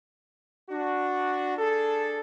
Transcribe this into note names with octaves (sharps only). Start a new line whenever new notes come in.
D4 F#4
D4 G#4 A4